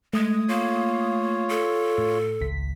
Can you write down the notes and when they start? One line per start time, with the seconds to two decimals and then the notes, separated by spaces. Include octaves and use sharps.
0.13 G#3 A3 D#6 G#6
0.49 A#3 F4 C#5
1.49 A4
1.98 A2
2.41 G#1 C#2 B6